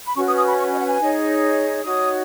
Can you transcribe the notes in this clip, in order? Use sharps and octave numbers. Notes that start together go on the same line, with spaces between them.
B5
C#4 F#4 B4 C#6
D#6
D#6
B5
C#6
D#5
F#5
G#5
D#4 G#4 C#5
D#4 F#4 C#5 D#6